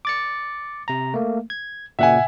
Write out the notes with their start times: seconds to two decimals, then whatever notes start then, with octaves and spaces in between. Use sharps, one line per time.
0.05 D6 A6 C#7
0.88 C3 A#5
1.14 A3 A#3
1.50 G#6
1.99 A#2 C#3 E5 F#5 G#5